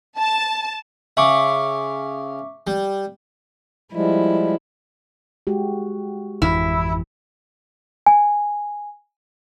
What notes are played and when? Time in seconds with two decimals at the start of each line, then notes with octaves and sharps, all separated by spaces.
0.18 A5
1.17 C#3 E5 C#6 D6
2.67 G3
3.93 F3 G3 G#3 E4
5.47 G#3 F#4 G4
6.42 G#1 F2 E3 E4
8.06 G#5